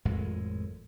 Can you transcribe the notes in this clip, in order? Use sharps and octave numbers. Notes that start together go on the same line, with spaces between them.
G#1 F2 A2 G#3